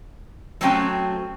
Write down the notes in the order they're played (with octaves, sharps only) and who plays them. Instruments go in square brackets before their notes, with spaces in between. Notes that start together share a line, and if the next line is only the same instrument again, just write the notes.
[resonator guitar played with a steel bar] F#3 A3 C4 C#4 F#4 G5